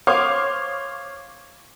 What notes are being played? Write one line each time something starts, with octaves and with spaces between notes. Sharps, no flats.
C5 C#5 F5 D6 D#6